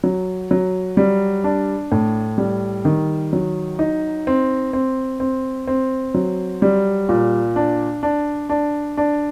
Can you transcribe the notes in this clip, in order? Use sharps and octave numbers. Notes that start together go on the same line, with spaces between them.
F#3
F#3
G3
D4
A2
G3
D#3
F#3
D#4
C4
C4
C4
C4
F#3
G3
A#2
D4
D4
D4
D4